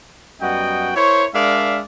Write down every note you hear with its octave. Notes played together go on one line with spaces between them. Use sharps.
F#2 G3 B3 F#4 D#5 G5
E4 A#4 C5 C#5
G#3 D4 A#4 D5 E5 F5